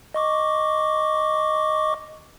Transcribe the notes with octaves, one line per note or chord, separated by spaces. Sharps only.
D#5 C#6 D6